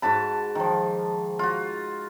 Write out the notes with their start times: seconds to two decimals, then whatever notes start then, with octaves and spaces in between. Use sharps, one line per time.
0.02 G#2 F#4 A5 B5
0.55 D#3 F3
1.39 F4 F#4